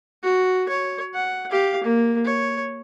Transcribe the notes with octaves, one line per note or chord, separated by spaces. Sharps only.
F#4
C#5
F#5
G4 F5
A#3
C#5